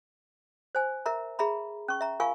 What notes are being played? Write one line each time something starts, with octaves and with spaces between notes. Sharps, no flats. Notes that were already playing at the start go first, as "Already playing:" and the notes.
C5 G#5
A#4 E5 A#5
G#4 E5 A#5 B5
C#4 C#6
E5 A#5
F4 A#4 F5 G#5 C#6